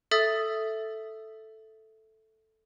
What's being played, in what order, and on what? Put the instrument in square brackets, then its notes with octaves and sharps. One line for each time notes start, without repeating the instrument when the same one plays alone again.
[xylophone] A4 E5 D#6 A6